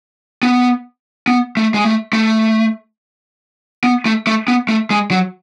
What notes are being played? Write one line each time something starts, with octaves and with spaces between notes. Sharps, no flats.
B3
B3
A3
G#3
A3
A3
B3
A3
A3
B3
A3
G#3
F#3